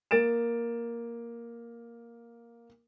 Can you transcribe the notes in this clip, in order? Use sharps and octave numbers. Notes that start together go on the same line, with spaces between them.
A#3 A6 D7 E7